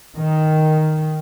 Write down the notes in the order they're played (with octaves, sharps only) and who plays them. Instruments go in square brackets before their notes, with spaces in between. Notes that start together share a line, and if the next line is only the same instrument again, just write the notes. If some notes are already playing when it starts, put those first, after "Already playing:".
[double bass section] D#3